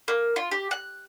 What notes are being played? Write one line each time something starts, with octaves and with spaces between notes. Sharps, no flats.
A#3
F4
G4
F#6